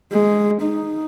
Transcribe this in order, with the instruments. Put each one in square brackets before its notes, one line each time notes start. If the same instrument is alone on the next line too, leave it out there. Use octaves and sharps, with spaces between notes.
[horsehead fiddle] G#3
D#4